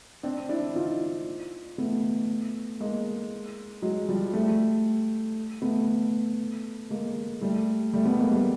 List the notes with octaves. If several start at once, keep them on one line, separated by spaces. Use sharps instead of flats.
C4 D4
D4 E4
D#4 F4
A3 B3
G#3 A#3
F#3 G#3
F3 G3
G3 A3
A3 B3
G#3 A#3
G3 A3
G3 A3
A3 B3
G#3 A#3
G3 A3